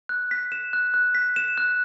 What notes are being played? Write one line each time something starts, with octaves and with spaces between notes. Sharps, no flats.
F#6
B6
E7
F#6
F#6
B6
E7
F#6